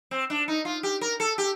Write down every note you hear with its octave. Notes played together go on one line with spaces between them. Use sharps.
C4
D4
D#4
F4
G4
A#4
A4
G4